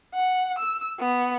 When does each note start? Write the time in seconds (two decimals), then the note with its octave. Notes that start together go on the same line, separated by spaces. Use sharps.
0.14 F#5
0.58 E6
0.99 B3